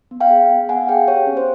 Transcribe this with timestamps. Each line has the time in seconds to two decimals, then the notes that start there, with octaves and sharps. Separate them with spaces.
0.11 B3
0.20 F5 G5
0.30 G#4
0.50 B3
0.69 B3 F#5 G#5
0.88 G#4 F5 G5
1.08 G4 C#5
1.27 C#4
1.37 C5